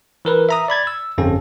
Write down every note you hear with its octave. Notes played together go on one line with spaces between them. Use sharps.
E3 A#4 B4
E5 A#5 D#6
D5 B5 G#6 A6
E6
G1 F2 C#4 A4